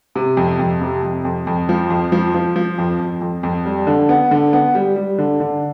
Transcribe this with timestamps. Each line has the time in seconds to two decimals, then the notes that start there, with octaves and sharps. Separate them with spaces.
0.16 C3
0.37 F2
0.59 F2
0.81 C3
1.03 F2
1.25 F2
1.47 F2
1.69 F3
1.90 F2
2.12 F3
2.34 F3
2.56 F3
2.78 F2
2.99 F2
3.22 F2
3.43 F2
3.65 G3
3.87 D3
4.09 B3
4.31 D3
4.53 B3
4.75 G3
4.96 G3
5.18 D3
5.40 D3